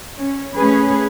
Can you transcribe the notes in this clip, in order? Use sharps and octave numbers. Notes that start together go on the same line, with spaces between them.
C#4
A3 C#4 G#4 B4